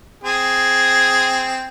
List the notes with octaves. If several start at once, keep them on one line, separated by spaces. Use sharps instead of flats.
C4 G#4